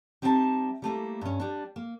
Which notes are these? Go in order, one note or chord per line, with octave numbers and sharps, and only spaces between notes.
G3 C4 D#4 E5 F#5 A5
G3 A3 A#3 E4
G2 C#4
G3 D4
A#3